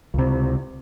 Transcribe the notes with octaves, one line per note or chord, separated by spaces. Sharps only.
C#2 C3